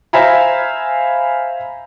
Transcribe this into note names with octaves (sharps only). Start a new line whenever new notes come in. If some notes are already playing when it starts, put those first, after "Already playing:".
C5 E5 F5 G#5 A#5 B5